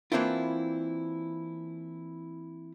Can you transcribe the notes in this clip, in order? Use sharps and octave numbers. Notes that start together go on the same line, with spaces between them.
E3 A#3 C4 D4 E4 F4